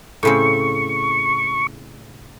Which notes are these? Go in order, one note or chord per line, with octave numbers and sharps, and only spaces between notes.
A2 C#3 C4 C#6